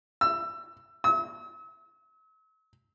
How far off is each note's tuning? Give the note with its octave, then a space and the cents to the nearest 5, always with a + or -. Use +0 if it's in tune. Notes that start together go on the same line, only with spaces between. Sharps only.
E6 +20
E6 -45